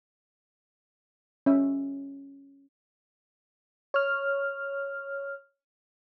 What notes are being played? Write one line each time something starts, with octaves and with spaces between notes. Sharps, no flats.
C#4 E5
C#5 F6